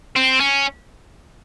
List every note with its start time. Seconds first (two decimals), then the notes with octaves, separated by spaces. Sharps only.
0.16 C4
0.40 C#4